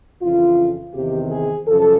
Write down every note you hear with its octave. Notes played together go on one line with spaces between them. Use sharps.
F2 C#3 E3 F4
E2 C3 D#3 G4
G#4
F#2 C#3 F3 A4